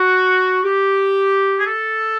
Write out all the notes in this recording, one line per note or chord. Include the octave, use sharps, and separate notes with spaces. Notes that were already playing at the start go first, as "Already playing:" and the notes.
Already playing: F#4
G4
G#4
A4